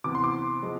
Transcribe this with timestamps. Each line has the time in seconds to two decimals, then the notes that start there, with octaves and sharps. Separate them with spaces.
0.04 C3 E3 B3 D6
0.15 C6
0.24 D6
0.63 F3 G#3 B3